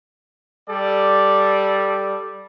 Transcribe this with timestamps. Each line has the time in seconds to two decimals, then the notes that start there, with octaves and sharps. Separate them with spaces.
0.68 G3 A4 D5